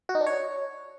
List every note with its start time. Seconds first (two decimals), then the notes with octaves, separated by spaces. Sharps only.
0.09 F#4
0.15 D#4
0.21 D4
0.26 C#5